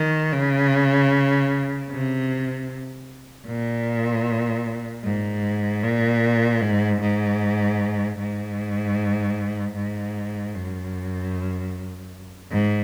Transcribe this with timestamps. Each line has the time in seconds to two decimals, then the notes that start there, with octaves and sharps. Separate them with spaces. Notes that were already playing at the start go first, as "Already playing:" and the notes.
Already playing: D#3
0.32 C#3
1.90 C3
3.47 A#2
5.04 G#2
5.83 A#2
6.61 G#2
7.01 G#2
8.19 G#2
9.76 G#2
10.54 F#2
12.51 G#2